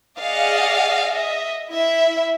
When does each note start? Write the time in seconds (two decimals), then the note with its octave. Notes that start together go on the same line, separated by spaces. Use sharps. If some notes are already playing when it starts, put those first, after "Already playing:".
0.21 G#4 D5 D#5 F5 F#5
1.14 D#5 E5
1.71 E4 E5